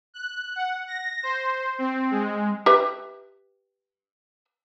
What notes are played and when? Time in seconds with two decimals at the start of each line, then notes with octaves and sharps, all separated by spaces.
0.14 F#6
0.56 F#5
0.87 A#6
1.23 C5
1.78 C4
2.11 G#3
2.66 G4 B4 E5